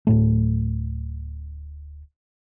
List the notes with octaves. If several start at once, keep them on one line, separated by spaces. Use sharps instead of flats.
D1 A2 A3